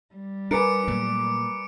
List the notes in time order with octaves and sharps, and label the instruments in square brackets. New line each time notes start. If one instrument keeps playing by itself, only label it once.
[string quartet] G3
[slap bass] D4 [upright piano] A#4 B4 G#5 [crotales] D6 C#7 D7
[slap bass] A#2 F#3 A3